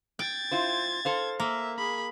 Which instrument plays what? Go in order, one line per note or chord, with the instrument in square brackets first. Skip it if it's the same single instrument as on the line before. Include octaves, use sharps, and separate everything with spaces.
[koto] G5 [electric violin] G#6 A6
[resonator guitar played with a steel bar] E4 F4 C5
A4 C5 F5
[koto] A#3 [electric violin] E5
[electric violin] G#4 B5